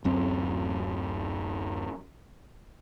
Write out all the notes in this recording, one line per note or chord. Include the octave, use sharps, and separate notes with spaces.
D1 F#2 C4